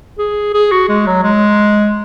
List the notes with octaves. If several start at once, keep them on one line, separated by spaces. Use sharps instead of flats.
G#4
G#4
F#4
G#3
F#3
G#3